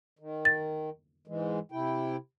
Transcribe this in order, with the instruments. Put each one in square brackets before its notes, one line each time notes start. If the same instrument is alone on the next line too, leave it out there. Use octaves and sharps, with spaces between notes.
[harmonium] D#3
[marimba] A6
[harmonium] G#2 E3 G#3
C3 E4 G5